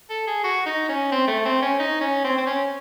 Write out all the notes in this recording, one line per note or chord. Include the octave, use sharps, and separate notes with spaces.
A4
G#4
F#4
D#4
C#4
C4
A3
C4
C#4
D#4
C#4
C4
C4
C#4